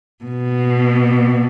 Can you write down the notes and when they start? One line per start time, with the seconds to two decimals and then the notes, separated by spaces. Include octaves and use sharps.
0.24 B2